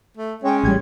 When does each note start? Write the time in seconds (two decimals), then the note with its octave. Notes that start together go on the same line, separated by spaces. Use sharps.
0.17 A3
0.44 G#3 C#4 C#5 G5
0.63 A1 G3 G#6